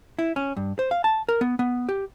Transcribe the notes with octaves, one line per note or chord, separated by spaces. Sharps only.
E4
C#4
G2
C5
F5
A5
A#4
B3
B3
G4